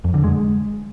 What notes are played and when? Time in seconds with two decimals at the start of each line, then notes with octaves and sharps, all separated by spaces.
0.04 F2
0.14 D3
0.24 G#3